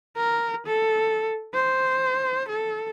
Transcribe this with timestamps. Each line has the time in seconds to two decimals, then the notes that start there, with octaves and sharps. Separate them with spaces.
0.17 A#4
0.66 A4
1.54 C5
2.49 A4